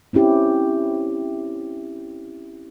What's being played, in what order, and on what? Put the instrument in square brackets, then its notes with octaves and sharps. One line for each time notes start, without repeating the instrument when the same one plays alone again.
[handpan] C4 C#4 E4 G4